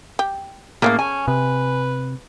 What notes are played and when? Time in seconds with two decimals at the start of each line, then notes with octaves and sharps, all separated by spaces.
0.19 G4
0.82 A2 C#3 G#3 A#3 A#4
0.99 C#4 G#5
1.28 C3 B4